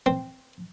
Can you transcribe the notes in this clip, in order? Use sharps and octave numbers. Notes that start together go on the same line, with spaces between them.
C4